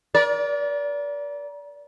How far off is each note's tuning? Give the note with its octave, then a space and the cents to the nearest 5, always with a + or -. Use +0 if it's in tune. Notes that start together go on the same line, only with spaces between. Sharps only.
A#4 +35 D5 -25